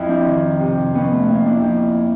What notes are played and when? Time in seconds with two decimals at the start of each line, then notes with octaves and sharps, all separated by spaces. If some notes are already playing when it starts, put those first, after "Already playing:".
Already playing: F2 E4
0.08 C4 D4
0.26 D#3
0.60 C3
0.94 F2 B3 C#4
1.12 A3
1.28 F2 A#3
1.46 D4 E4
1.62 F2 D4 E4